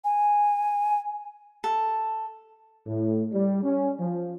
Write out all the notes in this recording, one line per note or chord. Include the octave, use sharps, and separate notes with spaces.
G#5
A4
A2
G3
C#4
F3